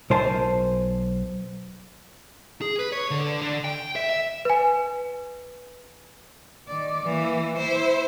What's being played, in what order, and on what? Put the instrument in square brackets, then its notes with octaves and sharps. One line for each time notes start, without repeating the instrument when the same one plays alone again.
[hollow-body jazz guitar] B1 A#4 C5 G#5 A5
[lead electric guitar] G#4
B4
C#5
D3
D3
G5
E5
E5
[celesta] B4 G#5
[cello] D#3 D5
E3 A#3
E4 C5